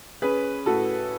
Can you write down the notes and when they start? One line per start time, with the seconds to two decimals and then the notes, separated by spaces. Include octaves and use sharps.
0.22 C#4 G#4 B4
0.66 A2 F#4 A4